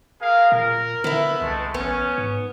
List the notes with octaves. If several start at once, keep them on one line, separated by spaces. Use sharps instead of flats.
G#4 A#4 F5
A#2 A#4
D3 B3 E4
C2 G#3 A3
A1 B3 C#4
G#2